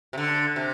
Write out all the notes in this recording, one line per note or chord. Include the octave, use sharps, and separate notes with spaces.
C3
D3
C3